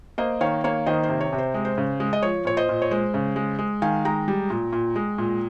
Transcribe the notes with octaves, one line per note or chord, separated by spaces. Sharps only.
A#3 C5 D#5
D#3 C#5 F5
A#3 C#5 F5
D#3 C5 D#5
C5
C3
C#5
C3
C5
G#3
C5
C#3
G#3
D#5
F3 C#5
A#2 C#5
C5 D#5
A#2
C#5
G#3 C5
C#3
G#3
G#3
D#3 F5 G#5
G#3 G5 A#5
G3
A#2
A#2
G#3
A#2